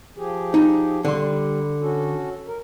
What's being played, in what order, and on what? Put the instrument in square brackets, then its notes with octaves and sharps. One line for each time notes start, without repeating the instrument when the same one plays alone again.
[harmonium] F3 G4 G#4
[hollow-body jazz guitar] D#4
[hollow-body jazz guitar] D3 C6 [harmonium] G3
[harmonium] C#4 F#4 A4
A#4